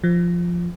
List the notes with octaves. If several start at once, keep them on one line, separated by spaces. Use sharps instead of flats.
F3